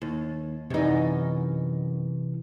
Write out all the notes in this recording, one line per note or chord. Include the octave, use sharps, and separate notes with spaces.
D#2
F#2 C3 E3 D#4